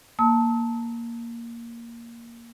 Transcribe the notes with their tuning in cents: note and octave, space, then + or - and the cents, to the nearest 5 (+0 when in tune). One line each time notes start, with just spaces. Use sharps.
A#3 +0 A5 +0 E6 -45